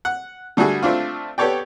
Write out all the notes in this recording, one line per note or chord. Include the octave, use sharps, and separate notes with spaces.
F#5
D3 G3 A3 F#4 G#4
A3 C4 D4 F4
B3 G4 A4 C#5 D5 G5